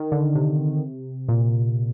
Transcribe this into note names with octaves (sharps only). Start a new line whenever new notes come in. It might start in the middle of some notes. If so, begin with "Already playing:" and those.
Already playing: D#3
D3
C3
A#2